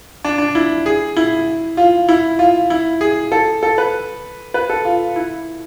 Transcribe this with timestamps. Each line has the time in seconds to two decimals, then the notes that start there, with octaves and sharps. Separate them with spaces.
0.25 D4
0.38 D4
0.55 E4
0.86 G#4
1.17 E4
1.77 F4
2.09 E4
2.39 F4
2.70 E4
3.01 G#4
3.32 A4
3.63 A4
3.78 B4
4.54 B4
4.70 A4
4.85 F4
5.16 E4